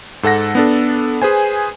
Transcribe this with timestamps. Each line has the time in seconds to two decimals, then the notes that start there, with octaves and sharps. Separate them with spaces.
0.23 G#2 A4 F#5 A#6
0.55 B3 D4 A4
1.22 G#4 B4 C5 G#5